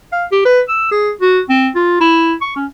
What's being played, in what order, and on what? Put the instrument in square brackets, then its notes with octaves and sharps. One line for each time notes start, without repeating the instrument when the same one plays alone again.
[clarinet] F5
G4
B4
E6
G#4
F#4
C4
F4
E4
C#6
C#4